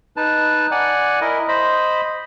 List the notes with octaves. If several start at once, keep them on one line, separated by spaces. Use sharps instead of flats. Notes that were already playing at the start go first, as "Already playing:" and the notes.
D#4 B4 A5
D5 F#5 G#5
E4 A#4 D#5
C5 D#5 B5